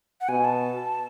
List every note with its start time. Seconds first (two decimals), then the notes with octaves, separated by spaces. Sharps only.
0.21 F#5
0.29 B2 G#5
0.45 A5